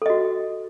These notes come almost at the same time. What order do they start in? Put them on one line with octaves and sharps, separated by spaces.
A4 D#5 F#4